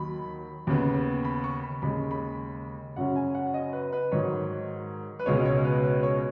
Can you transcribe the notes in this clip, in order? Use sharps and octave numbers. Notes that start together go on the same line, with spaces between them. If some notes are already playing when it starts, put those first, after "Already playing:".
Already playing: D#2 D#3 F#3 B5
D#2 C#3 B3
B5
C#6
B5
D#2 C#3 G#3 B5
B5
F#2 C#3 F#3 C#4 F#5
G#5
F#5
D#5
B4
B4
G#2 D#3 F#3 C#5
B4
C#2 B2 G#3 C#4 C#5
C#5
B4
B4
C#5